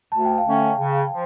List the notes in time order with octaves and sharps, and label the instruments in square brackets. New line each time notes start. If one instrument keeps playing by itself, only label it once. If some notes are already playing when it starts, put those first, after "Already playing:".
[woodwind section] D2 [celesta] A5
[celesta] G5
F5
[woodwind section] D3 A3 C#4
[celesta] G5
[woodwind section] C#3
F3